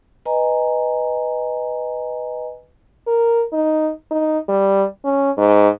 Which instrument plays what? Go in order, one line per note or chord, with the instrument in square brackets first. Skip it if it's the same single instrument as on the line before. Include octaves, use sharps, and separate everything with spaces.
[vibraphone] B4 D#5 G#5 A#5
[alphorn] A#4
D#4
D#4
G3
C#4
G#2